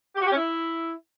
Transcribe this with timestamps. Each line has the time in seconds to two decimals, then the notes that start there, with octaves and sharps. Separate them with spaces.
0.15 G4
0.20 F#4
0.26 G4
0.31 C#4
0.36 E4